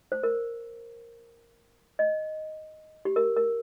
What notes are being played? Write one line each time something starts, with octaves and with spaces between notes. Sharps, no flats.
C5
A#4
D#5
G4
A#4
A#4